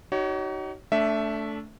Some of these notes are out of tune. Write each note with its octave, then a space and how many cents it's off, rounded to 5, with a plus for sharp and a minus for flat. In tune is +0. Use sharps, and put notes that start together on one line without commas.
D#4 +0 F#4 +40 C#5 +15
A3 +0 D4 -25 E5 +0